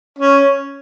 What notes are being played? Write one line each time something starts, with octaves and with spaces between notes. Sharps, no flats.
C#4